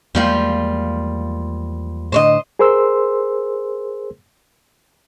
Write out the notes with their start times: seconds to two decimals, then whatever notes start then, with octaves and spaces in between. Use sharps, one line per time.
0.15 E2 F3 G3 G#3 A#3 F4
2.12 A2 D3 C5 C#5 D#5
2.59 G#4 A#4 C5 C6 E6